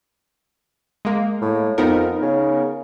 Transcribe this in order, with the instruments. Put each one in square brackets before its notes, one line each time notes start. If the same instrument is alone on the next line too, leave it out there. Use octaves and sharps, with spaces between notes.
[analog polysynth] G#3 A#3
[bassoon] A2
[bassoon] F2 [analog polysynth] B3 D#4 A#4
[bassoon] C#3